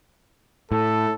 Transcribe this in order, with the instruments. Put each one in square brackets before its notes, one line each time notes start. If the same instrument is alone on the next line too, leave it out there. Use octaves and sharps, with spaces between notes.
[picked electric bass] A2 [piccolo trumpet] A4